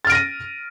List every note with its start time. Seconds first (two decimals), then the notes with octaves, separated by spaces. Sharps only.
0.05 A6
0.07 F6
0.10 D7
0.12 A#6
0.15 D#7